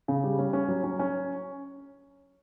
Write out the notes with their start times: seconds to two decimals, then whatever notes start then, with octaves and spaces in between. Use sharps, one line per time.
0.08 C#3
0.24 G3
0.38 C#4
0.53 C#4
0.68 F#3
0.84 C#4
0.99 C#4